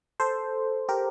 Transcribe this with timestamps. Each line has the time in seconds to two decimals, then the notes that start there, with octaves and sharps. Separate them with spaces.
0.20 A4 C5
0.89 G4 A#4